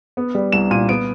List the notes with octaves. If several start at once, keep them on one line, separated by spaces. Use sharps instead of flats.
B3
G3
C2 E7
A#2 D#7
B3 D7